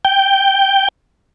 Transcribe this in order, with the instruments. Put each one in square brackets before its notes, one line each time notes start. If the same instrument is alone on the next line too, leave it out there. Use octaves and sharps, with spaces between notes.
[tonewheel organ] G5